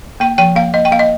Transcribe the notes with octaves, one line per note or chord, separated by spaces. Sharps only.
A#3 G5
F3 G5
A#3 F5
A#3 D#5
G5
A#3 F5
D#5